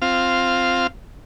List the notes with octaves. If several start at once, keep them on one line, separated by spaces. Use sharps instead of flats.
C4 F4 F5